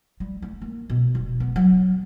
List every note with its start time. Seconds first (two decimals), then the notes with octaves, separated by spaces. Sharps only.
0.20 G3
0.42 A3
0.62 A#3
0.90 B2
1.15 E1
1.40 B3
1.56 F#3